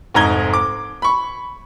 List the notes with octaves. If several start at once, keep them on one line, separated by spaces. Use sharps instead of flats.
F1 G#2 D#4 A#5 G#6 G7
D6
B5 C#6